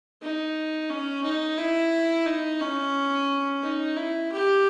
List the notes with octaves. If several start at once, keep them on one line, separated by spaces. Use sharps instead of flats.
D#4
C#4
D#4
E4
D#4
C#4
D#4
E4
G4